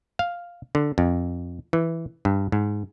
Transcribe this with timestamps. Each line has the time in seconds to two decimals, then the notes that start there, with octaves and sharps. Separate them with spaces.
0.19 F5
0.75 D3
0.98 F2
1.73 E3
2.25 G2
2.52 G#2